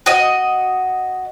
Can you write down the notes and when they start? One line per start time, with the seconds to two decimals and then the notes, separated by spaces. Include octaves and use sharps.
0.06 F#4 D#5